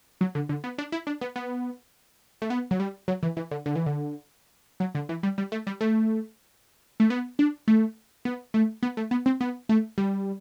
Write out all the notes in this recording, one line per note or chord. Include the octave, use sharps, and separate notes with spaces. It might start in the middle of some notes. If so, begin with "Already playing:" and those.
F#3
D3
D3
B3
D4
E4
D4
B3
B3
A3
B3
F#3
G3
F#3
E3
E3
D3
D3
E3
D3
F#3
D3
E3
G3
G3
A3
G3
A3
A3
B3
D4
A3
B3
A3
B3
A3
B3
C4
B3
A3
G3